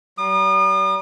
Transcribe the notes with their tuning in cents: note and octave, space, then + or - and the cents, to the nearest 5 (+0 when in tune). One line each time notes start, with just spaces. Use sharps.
G3 -45 D#6 -40